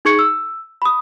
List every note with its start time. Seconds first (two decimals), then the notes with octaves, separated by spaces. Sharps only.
0.05 D#4 G#4 C#6 G#6 C#7
0.19 E6
0.82 B5 D#6